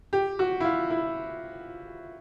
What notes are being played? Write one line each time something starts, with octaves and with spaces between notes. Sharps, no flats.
G4
F#4
E4
F4
E4